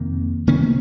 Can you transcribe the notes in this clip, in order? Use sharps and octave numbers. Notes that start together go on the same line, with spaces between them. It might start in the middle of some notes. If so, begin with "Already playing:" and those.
Already playing: F2 C3 D#3 A#3
C3 D#3 A#3 C#4